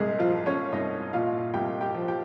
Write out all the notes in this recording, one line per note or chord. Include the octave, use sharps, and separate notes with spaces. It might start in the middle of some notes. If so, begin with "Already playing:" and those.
Already playing: C2 A#2 G#3 G4 G#4
F3 F4
F3
C#4 C#5
C2 D#4 D#5
A#2 F4 F5
C2 G4 G5
G4 G5
F3
G4 G5